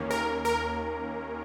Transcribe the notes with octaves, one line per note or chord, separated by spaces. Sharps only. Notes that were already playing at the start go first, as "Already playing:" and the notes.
Already playing: D#2 D#3 A#3 C#4
A#4
A#4